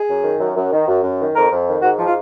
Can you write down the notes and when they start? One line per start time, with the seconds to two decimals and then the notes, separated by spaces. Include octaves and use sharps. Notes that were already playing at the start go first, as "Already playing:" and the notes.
Already playing: G#4
0.09 F#2
0.24 D#3
0.40 F#2
0.56 F#2
0.72 D#3
0.87 F#2
1.03 F#2
1.20 D#3
1.35 F2 A#4
1.52 F2
1.67 D#3
1.82 G#2 F#4
1.99 F3
2.06 F4